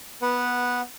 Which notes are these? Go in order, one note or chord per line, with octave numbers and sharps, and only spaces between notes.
B3 B4 F#5